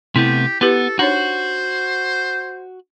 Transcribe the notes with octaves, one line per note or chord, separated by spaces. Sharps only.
C3 A3 B3 E4 G4
B3 E4 G4 A4 B4
D4 D#4 F#4 C5 C#5